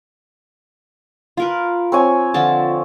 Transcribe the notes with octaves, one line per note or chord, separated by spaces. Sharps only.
F4 A#4 B4
C4 C#5 G#5
D3 F3 A5